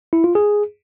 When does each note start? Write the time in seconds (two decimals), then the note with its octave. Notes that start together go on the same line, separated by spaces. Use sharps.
0.13 E4
0.24 F4
0.35 G#4